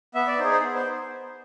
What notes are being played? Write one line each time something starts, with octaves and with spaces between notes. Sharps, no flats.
B3 E5
D5
D#4 G#4 C5
C5
B3
C5